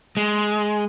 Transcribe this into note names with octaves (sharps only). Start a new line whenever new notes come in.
G#3